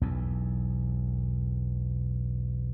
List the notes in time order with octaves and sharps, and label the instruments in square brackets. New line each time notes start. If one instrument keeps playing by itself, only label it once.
[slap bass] B1 E2